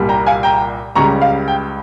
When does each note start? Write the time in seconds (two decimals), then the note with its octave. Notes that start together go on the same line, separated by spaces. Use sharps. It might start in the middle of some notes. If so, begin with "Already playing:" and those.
Already playing: C2 A#2 G3
0.09 G5 A#5
0.26 F5 G#5
0.43 G5 A#5
0.95 C#2 C#3 G3 A#5 C#6
1.22 F5
1.48 G5